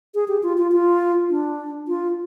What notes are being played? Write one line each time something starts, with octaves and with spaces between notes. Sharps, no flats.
G#4
G4
F4
F4
F4
D4
F4